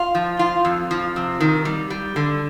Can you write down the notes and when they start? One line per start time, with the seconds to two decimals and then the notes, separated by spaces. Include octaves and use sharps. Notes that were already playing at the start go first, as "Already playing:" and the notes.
Already playing: F4
0.15 F3
0.39 F4
0.65 F2
0.91 F3
1.16 C3
1.41 D#3
1.65 G3
1.90 G3
2.16 D3